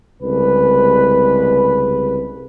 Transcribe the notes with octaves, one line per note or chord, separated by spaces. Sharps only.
C2 C#3 G#3 B4